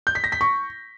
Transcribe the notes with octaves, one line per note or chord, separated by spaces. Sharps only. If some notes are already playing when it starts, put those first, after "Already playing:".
G6
B6
A#6
B6
C#6